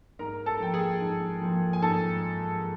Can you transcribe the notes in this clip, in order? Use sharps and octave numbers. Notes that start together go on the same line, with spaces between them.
G#2 A#4 A#5
A4 A5
F3 A#3 G5
G#4 G#5
G#2
F3 A#3
G#5
G#2 A4 A5